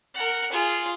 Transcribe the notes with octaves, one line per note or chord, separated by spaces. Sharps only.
A#4 F#5
F4 G#4